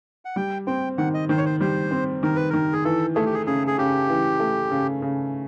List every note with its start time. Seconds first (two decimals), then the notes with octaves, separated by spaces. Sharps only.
0.25 F#5
0.36 G3 G5
0.67 C4 G5
0.98 D#3 F#5
1.14 D#5
1.29 D#3 C5
1.37 C#5
1.45 C5
1.61 G3 C5
1.91 C4
2.23 D#3 A#4
2.36 B4
2.50 D#3 A#4
2.73 G#4
2.85 E3 A4
3.15 A3 G#4
3.26 G4
3.34 G#4
3.47 C#3 G#4
3.67 G#4
3.78 C#3 G4
4.09 E3
4.40 A3
4.71 C#3
5.02 C#3